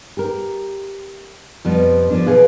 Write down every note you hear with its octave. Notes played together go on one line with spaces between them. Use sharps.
G4 A#4
F2 B2 F3 G3 B3
F3 A#3 D4
B2 E3 G#4 B4 F5